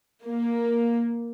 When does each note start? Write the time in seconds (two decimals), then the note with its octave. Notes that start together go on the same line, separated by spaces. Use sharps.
0.25 A#3